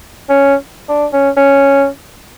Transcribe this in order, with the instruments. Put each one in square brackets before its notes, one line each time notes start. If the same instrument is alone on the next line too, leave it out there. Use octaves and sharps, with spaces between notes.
[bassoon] C#4
D4
C#4
C#4